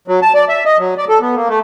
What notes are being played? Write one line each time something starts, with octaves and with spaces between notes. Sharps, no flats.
F#3
A5
D5
E5
D#5
F#3
D5
A4
B3
A#3
A3